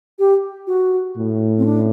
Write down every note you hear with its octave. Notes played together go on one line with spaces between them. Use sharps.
G4
F#4
A2
C4
D4